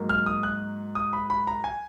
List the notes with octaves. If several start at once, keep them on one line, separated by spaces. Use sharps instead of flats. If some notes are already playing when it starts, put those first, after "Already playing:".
Already playing: G#2 F#3 A#3
F6
D#6
F#6
D#6
B5
B5
A#5
G#5